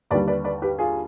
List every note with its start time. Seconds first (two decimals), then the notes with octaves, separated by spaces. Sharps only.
0.10 D#2 B4 D5
0.14 D3 G3
0.28 B4 D5
0.44 B4 D5
0.62 G4 B4
0.79 F4 G#4